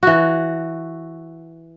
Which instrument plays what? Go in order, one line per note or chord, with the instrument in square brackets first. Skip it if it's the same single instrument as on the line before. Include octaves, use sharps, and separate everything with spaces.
[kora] E3 F#4